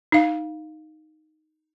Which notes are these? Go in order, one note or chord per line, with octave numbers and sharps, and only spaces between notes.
D#4 F5